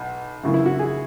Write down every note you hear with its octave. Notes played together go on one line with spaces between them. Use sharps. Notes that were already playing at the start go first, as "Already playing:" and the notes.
Already playing: B1
F#2 C#3 E3
E4
F#4
G#4